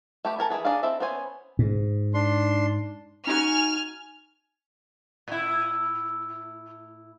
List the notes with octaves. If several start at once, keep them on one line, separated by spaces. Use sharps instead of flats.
A3 G4 B4
A4 A#4 G#5
E3 F3 G#4 B4
D4 D#4 G#4 F5
C4 E4 A4 E5
B3 C#4 C5 G#5
G#2
D4 C6
D#4 E4 F#4 G#5 F6
A2 E4